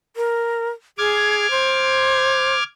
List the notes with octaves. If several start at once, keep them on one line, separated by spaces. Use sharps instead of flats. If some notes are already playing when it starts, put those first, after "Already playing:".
A#4
G#4 D6 F6 G#6
C5